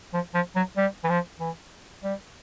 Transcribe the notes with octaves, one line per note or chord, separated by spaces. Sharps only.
F3
F3
F#3
G3
E3
F3
E3
G3